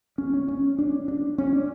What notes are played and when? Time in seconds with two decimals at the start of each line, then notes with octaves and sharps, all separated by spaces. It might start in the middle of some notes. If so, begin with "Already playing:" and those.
0.18 C#4
0.34 C#4
0.48 C#4
0.78 D4
1.08 D4
1.38 C#4
1.53 D4